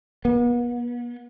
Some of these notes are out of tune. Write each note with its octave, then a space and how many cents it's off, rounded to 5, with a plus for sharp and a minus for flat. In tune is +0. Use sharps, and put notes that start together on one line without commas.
B3 -40